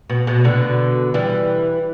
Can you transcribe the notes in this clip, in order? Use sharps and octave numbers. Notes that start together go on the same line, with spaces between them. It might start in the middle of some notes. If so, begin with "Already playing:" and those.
B2
B2
B2 D3
E3 G3